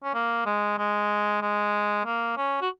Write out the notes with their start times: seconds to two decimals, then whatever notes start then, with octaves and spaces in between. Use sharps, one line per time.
0.04 C#4
0.14 A#3
0.46 G#3
0.78 G#3
1.42 G#3
2.05 A#3
2.37 C#4
2.62 F#4